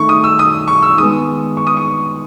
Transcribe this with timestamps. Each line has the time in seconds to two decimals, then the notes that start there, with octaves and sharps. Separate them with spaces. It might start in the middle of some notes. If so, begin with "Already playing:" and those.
Already playing: D#3 A3 C#6
0.09 D#6
0.24 E6
0.39 D#6
0.68 C#6
0.82 E6
0.98 D#3 G#3 B3 D#6
1.57 C#6
1.67 D#6
1.77 C#6